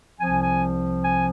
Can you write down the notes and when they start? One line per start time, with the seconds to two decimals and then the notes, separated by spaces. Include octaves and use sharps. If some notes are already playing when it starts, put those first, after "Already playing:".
0.20 C2 C3 F3 C4 G#5
0.41 G#5
1.03 G#5